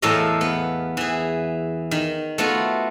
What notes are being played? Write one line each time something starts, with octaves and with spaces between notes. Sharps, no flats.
E2 A2 A4 A#4 D#5 F5
B3
E3 G#4
D#3
A3 B3 F4 F#4